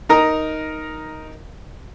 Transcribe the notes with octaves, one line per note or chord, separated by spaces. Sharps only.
D#4 A#4 A#5 D#6